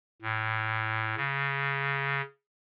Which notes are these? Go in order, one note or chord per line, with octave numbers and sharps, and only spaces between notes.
A2
C#3